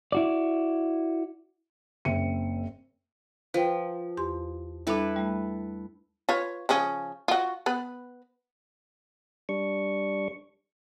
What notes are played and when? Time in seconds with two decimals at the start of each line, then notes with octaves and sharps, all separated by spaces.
0.12 E4 F#4 D5
2.05 F#1 C4 E5 C#7 D#7
3.54 F3 B4 G5
4.17 E2 G4 C6
4.87 G3 D4 E4 A4 B4
5.16 G3 A3
6.29 F4 B4 C#5
6.69 C#3 F3 C#4
7.28 F4 F#4
7.66 B3 B4
9.49 G3 D4 C#6